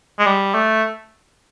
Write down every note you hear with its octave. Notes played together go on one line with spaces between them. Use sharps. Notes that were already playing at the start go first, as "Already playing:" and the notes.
G#3
G3
A3